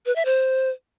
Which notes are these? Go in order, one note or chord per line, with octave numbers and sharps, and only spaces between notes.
B4
E5
C5